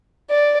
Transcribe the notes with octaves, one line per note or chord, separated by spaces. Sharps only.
D5